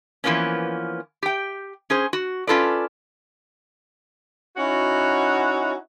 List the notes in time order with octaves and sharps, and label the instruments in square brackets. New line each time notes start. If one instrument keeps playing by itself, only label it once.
[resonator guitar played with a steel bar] E3 F3 A#3 B3 C#4
G4 G5
C#4 G#4 C5
F#4
C#4 F4 A4 B4 D5
[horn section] C#4 D#4 E4 F#4